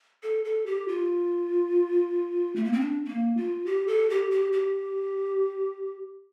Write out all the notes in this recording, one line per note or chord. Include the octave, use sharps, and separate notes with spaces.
A4
A4
G4
F4
A3
A#3
C4
D4
C4
A#3
F4
G4
A4
G4
G4
G4